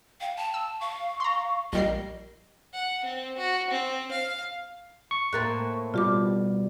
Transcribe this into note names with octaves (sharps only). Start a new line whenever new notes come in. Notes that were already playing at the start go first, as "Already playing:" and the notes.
F5 G5
A5
E6
F5 C#6
A#5 C6
A#1 G3 A#4 D#5 C7
F#5
C4
F#4
C4
F5
C#6
A2 A#3 C4 F#6 A6
B2 G3 F4 G4 D6